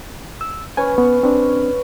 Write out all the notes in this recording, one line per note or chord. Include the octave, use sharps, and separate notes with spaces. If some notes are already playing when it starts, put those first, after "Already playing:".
E6
C#4 B4 C#5 G#5
B3
C4 D4